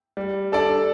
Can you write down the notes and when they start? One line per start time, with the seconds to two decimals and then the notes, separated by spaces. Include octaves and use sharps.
0.17 G3
0.52 D4 A4 D5